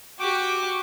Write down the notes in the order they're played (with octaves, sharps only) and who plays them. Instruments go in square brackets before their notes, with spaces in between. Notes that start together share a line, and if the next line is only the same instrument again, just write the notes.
[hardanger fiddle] F#4 G4 [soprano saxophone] D6